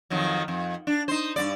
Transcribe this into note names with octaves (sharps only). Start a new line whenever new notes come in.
F2 D#3 F#3
F2
D4
D#4 C5
G2 B2 D5